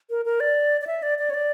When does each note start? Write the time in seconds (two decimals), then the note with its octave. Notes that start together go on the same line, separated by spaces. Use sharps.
0.10 A#4
0.25 A#4
0.40 D5
0.81 D5
0.87 E5
1.03 D5
1.18 D5
1.30 C#5
1.34 D5